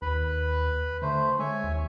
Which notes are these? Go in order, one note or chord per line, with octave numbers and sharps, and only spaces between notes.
D#2 B4 B5
D3 A3 C5
G#3 C#5 E5 G#5
D#2